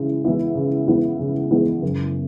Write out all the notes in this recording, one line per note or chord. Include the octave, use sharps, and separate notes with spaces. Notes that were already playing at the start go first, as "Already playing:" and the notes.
Already playing: C#3 E3 G#3 E4
E3 G#3 B3 E4
C#3
E3 G#3 B3 E4
C#3
E3 G#3 B3 E4
F#1